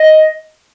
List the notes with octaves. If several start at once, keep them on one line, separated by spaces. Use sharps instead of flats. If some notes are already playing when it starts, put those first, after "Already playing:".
Already playing: D#5